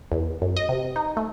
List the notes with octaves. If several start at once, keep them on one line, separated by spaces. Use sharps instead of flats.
E2
F#2
D#5
C3
D#4
A3